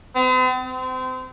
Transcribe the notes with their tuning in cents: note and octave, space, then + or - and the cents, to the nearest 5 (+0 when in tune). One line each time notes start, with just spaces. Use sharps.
C4 -45
C4 -30